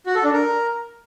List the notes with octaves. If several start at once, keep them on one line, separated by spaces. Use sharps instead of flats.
F#4
A4
D4
A#4